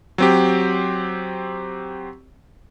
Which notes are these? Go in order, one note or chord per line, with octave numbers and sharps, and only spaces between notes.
F#3 C4 G4